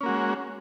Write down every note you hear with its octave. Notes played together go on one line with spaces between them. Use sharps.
G#3 A#3 C#4 F#4